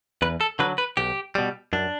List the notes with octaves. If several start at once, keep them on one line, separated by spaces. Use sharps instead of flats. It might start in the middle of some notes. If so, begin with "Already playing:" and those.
E2 B4
A4
D3 F#3 B4
B4
B1 G4
B2 G3
F#2 D4